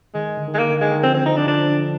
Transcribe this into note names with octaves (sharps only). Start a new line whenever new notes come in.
D#3 G#3
D3
D#3
G#3
D#3 A#3
D3
D#3 G#3
D#3
D3 F3 C4
C4
D#4
D4
D3 F3 D4